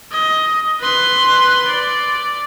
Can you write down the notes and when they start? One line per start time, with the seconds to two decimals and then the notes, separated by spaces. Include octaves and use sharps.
0.11 D#5
0.81 B4 C6
1.67 D5